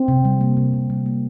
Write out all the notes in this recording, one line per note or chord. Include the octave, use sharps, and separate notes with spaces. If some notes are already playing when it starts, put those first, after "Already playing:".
Already playing: C4
C3
G3
A#3
C3
C3
G3
A#3